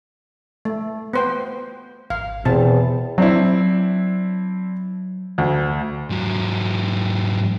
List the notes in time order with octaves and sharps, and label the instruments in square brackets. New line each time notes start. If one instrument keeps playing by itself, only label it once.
[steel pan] A3
B3 C5 G5
[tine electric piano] G#1 [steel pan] F5
[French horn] E2 [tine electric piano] B2 [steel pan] C4 A5
[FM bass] F#3 [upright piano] C4 D4 E4
[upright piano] D2
[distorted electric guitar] G#2 F#3